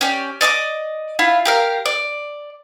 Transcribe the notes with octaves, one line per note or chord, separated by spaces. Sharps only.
C#4 G4 D5
D5 D#5 C#6 D6
E4 F4 F5
G4 A#4 F5
D5